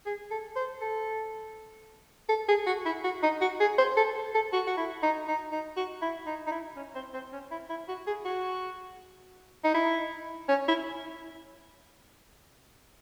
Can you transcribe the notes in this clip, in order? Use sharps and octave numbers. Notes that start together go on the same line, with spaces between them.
G#4
A4
C5
A4
A4
G#4
F#4
E4
F#4
D#4
F#4
G#4
C5
A4
A4
F#4
F#4
E4
D#4
D#4
D#4
F#4
E4
D#4
D#4
E4
C#4
C4
C4
C#4
E4
E4
F#4
G#4
F#4
D#4
E4
C#4
E4